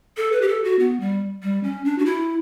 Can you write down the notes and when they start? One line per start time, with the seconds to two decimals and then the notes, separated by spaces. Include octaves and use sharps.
0.17 A4
0.32 B4
0.42 G4
0.48 A4
0.64 F#4
0.79 B3
1.00 G3
1.43 G3
1.64 C#4
1.85 D4
1.98 F#4
2.06 E4